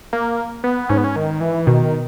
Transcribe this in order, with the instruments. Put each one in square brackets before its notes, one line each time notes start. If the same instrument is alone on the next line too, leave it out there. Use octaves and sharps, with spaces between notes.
[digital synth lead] A#3
B3
[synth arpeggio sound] G#2 [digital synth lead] C#4
[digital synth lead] B3
C#4
D#3
E3
[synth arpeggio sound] B2 [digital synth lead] D#3